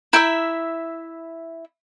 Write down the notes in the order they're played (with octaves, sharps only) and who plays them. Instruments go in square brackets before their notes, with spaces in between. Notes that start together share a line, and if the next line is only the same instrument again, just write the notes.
[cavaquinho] E4 E5 [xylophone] A#5 G6 D7